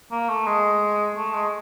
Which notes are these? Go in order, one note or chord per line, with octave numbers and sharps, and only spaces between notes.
A#3
A3
G#3
A3
G#3